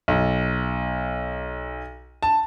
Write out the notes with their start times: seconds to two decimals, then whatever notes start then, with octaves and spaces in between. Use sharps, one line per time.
0.08 B1
2.23 A5